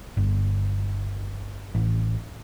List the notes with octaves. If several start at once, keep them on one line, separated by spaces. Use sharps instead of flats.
G1
A1